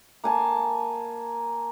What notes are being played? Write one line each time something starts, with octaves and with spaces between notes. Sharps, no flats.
A#3 G#5 A5